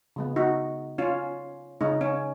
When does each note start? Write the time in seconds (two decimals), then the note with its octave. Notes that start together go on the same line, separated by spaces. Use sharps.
0.16 C#3 G#3 B3
0.36 D#4 F#4
0.98 C#4 F4
1.81 C#3 G#3 C#4 D#4
2.01 C#4